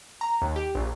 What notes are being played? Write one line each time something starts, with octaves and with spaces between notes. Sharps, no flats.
A#5
D#2
G4
A#1